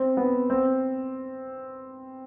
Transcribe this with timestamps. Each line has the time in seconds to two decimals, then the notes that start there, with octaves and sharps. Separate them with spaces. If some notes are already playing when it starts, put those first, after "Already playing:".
Already playing: C4
0.17 B3
0.50 C4